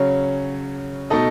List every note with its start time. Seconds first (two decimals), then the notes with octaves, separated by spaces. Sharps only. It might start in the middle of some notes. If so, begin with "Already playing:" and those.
Already playing: C#3 F#3 C#4
1.10 B2 A3 D#4 A4 D#5